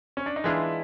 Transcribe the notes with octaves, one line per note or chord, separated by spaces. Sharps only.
C#4
D4
D#4
E3 G#3 B3 D4 E4 F4 G#4